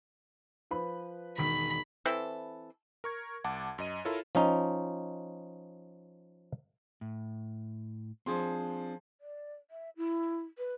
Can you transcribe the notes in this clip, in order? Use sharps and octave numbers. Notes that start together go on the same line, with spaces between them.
F3 B4 B5
E1 D#3 B5 B6
E3 C4 E4 A4
A#4 C#6 G#6
C2 F#5 A5 D6
F#2 D#5 D#7
E4 F4 A4 A#4 C#5
F3 C#4 D#4
A2
F3 C4 D4 G#4 C6
D5
E5
E4
B4